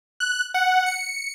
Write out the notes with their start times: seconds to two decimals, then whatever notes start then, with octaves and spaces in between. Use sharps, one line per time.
0.20 F#6
0.54 F#5
0.86 C#7